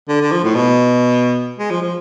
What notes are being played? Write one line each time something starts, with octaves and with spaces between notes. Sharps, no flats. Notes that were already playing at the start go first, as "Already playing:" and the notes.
D3
D3
F3
A2
B2
G#3
F3
F3